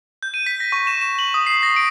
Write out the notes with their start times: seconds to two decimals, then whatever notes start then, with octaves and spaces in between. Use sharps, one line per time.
0.23 G6
0.34 D#7
0.46 B6
0.60 A#6
0.72 C#6
0.87 E7
1.01 E7
1.19 F#7
1.34 D#6
1.47 C7
1.63 A#6
1.76 D7